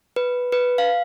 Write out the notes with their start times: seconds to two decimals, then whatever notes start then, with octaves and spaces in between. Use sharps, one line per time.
0.16 B4
0.52 B4
0.78 F5